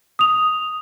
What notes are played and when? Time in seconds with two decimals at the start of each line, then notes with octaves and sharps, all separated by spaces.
0.19 D#6 F7